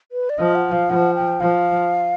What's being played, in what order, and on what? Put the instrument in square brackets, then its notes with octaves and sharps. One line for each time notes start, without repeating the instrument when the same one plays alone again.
[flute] B4
D5
[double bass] F3 [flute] D#5
[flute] F#5
F5
[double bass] F3 [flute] F#5
[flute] G5
[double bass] F3 [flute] F5